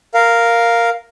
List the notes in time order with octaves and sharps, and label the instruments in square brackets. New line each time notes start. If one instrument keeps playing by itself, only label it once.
[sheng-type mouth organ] A#4 F5